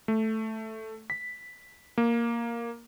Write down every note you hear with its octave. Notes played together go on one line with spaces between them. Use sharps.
A3
B6
A#3